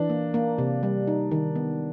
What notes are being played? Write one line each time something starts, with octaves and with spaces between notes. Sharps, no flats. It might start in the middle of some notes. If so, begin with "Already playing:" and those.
Already playing: E3 D4
A#3
A#3
C3
G3
D#4
D#3
B3